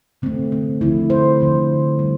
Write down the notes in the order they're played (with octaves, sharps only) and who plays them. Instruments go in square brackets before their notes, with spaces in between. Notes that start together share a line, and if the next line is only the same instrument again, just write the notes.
[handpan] D3 A3 C4
C4
D3 F3 A3 E4
C5
D3 F3 A3
G3